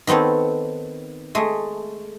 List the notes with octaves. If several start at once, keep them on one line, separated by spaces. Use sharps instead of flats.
D#3 B3 C4 A4 C#5
G#3 A3